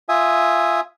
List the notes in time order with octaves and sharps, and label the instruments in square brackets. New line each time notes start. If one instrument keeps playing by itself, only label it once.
[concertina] F4 E5 G#5 D#6